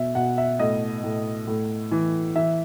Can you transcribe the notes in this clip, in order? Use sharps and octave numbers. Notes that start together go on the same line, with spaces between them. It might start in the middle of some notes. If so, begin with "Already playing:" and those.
Already playing: B2 E5
B2 F#5
E5
A2 D#5
A2
A2
E3
E3 E5